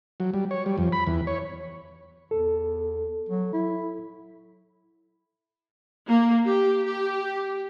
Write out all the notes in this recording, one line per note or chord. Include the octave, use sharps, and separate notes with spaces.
F#3
G3
C#5
G3
F2
B5
E2
C#5
E2 A4
F#3
E4
A#3
G4
G4